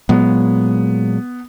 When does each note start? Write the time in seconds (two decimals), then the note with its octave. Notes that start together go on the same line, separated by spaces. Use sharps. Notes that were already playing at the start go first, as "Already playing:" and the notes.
0.09 A#2 F#3 G#3 B3